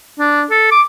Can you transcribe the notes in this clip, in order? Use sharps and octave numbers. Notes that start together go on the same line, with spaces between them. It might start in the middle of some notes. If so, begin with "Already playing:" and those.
D4
A4
D6